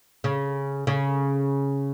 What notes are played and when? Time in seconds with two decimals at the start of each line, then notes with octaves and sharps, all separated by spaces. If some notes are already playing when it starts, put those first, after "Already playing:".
0.24 C#3
0.87 C#3